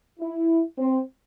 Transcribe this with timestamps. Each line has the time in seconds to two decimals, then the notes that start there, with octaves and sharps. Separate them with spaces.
0.20 E4
0.79 C4